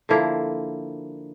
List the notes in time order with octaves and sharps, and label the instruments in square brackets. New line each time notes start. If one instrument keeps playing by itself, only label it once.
[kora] D3 F3 A#3 E4